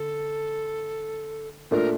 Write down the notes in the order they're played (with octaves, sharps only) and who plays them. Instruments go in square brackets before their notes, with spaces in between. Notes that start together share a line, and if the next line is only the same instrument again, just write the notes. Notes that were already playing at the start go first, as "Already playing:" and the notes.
Already playing: [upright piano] D3 [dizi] A4
[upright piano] A#2 A3 D4 [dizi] A#4